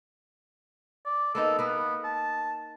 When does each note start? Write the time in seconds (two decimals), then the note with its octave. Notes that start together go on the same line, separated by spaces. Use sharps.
1.05 D5
1.35 A#3 B3 D#4 A4
1.59 A#3 B3 B4
2.04 A5